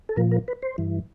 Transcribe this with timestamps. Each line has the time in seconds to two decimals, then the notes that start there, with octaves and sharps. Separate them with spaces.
0.09 A4
0.16 A#2 F3 A#4
0.31 A#4
0.48 B4
0.62 C5
0.78 G2 E3